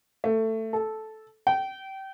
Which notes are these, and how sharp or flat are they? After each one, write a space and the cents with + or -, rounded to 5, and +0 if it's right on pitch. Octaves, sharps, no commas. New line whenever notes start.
A3 +15
A4 -10
G5 -25